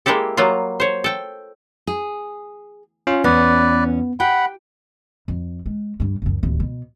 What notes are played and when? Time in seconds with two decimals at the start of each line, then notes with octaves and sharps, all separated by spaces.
0.06 G#3 A#3 E4 G4 A4
0.37 F#3 G3 A#3 F4
0.80 C5 C#5
1.04 A4 G5
1.87 G#4
3.07 C#4 F4
3.24 E2 B3 C#4 B4 D5
4.20 G4 F#5 G5 B5
5.28 F2
5.66 G#3
6.00 G2 G3
6.22 C#2 F#2
6.43 D1 D#2
6.60 B2